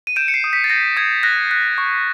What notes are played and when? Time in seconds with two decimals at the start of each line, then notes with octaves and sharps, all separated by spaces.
0.07 D#7
0.16 G6 D7 E7
0.28 C#7
0.34 C7
0.44 D#6
0.53 B6
0.64 A6
0.70 G6 A#6
0.97 D#6 G#6
1.23 F#6 A#6
1.51 F#6
1.78 C#6